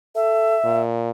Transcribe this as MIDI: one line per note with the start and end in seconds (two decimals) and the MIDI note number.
0.15 0.57 69
0.15 0.82 76
0.64 1.11 46